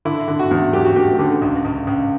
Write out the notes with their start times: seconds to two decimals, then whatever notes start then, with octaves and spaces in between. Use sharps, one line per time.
0.05 D3 E4
0.28 D3
0.39 F#4
0.51 E2
0.73 F#3 G4
0.85 F#4
0.96 A3 G4
1.19 D3
1.42 C#2
1.65 C#2
1.87 C#2